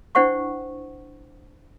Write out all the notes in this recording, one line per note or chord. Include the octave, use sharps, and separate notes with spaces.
D4 E4 C5 F#5 G5 C#6